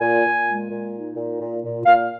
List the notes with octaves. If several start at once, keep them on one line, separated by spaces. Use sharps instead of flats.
A#2 G#5
A#2
G#3
A#2
D#4
A#2
A#2
A#2
A#2 F5